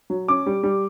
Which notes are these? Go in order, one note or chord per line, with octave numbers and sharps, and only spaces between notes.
F#3
C#4 D6
G3
G3